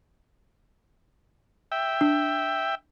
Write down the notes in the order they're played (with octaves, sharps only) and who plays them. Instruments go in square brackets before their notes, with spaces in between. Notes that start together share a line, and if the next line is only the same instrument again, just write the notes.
[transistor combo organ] E5 G5
[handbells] D4